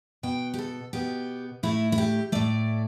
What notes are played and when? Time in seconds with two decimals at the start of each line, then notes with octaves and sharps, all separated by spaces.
0.23 B2 B3 G5
0.54 G4
0.59 A4
0.93 B2 B3 G4
1.63 A2 A3 E4
1.92 E4
1.98 G4
2.32 A2 A3 D5